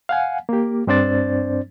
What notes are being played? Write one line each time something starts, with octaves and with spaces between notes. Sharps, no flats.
F5 F#5 G#5
A#3 G4
G2 C4 D4 C5 D5 A6